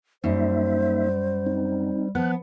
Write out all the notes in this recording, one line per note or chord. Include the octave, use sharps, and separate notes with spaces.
F#2 G3 A#3 D#4 C5 E5
C4 D#4
F3 B3 F#6